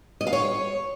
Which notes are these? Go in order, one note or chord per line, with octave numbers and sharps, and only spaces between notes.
D#5
F5
C#5